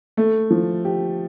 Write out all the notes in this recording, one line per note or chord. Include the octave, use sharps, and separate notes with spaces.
A3
F3
G4